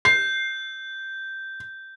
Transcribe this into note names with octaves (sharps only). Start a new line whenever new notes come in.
G6 C7